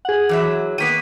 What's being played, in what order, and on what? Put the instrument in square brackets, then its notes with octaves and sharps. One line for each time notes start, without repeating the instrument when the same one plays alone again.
[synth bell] G#4 F#5
[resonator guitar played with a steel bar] E3 F#3 E5
[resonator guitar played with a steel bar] D#3 A#3 B3 [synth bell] B6 D#7